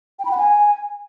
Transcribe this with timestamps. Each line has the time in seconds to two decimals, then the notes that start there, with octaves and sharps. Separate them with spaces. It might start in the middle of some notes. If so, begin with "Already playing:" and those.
0.19 G5
0.25 B5
0.31 F#5
0.37 G#5